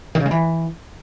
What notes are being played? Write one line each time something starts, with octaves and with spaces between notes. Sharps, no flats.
D#3
C#3
G#3
E3